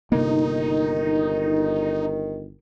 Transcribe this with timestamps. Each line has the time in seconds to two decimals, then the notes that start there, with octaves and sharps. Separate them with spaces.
0.12 G1 C3 D#3 A#3 D#4